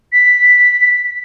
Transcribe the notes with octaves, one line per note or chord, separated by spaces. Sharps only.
B6